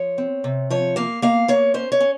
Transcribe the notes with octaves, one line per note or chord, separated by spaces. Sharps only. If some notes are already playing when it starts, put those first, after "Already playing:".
Already playing: F3 C#5
C4
C3
F3 C#5
A#3 F5
A#3 F5
A#3 C#5
C#4 C5
C#5
C#4